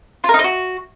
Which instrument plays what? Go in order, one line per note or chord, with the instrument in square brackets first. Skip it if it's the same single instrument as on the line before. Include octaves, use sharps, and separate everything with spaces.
[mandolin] F4
A#4
D#4
D#5
F#4